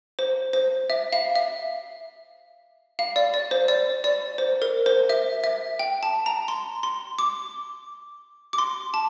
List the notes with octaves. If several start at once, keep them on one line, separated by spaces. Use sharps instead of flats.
C5
C5
E5
F5
E5
F5
D5
D5
C5
D5
D5
C5
A#4
C5
E5
E5
G5
A5
A#5
C6
C6
D6
D6
C6
A5